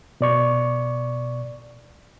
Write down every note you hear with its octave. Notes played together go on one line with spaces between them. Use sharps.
B2 D5 C#6